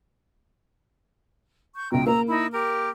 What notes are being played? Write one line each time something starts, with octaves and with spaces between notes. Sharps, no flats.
C#6 G6
C#2 B2 G5 A#5
A#3 A#5 E6
D#4 E4 B5
G4 A#4